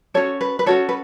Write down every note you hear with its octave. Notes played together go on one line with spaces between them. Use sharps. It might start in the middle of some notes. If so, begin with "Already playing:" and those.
C#4 F#4 A4 C#5
B4
B4
C#4 F#4 A4 C#5
B4